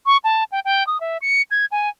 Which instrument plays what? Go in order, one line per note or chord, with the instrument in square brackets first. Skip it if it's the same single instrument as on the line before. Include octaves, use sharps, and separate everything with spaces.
[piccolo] C#6
A5
G5
G5
D#6
E5
C#7
G#6
G#5